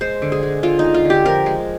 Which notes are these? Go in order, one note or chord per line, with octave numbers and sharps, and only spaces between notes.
G#3 C5
D3
G#4
G#3
D3 F4
D#4
G#3
F4
D3
G4
F3 A#4
G#3